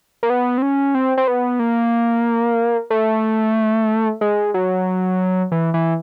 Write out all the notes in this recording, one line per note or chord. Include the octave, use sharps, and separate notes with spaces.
A#3
B3
C4
C#4
C4
C4
B3
A#3
A3
G#3
F#3
E3
E3